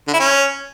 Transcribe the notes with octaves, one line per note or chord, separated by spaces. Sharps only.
D3
E4
C#4